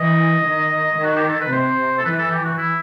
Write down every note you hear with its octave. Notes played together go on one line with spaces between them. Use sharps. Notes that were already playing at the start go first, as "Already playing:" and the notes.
Already playing: E3 D#5
D#3
D#3
F#4
G4
A4
B4
C3 C5
A4
E3 B4
A4
G4
F#4
E4